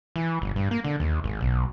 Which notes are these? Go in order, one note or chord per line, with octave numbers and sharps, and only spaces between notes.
E3
G1
G2
A#3
D3
D#2
G#1
B1